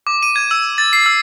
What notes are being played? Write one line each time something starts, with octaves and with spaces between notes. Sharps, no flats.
D6
D#7
G#6
E6
A6
C7
E6